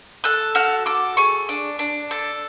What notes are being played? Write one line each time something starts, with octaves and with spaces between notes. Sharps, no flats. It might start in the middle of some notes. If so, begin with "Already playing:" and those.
A4 F#6
F#4 F6
A4 D6
G#4 C#6
D4
D4
A4